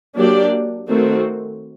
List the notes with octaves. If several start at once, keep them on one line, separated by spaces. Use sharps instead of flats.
F#3 A#3 D4 G4 D5
D#3 A3 C4 F#4